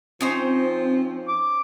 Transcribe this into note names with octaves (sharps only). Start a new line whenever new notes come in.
F3 C4 C#4 D#4 C5
D6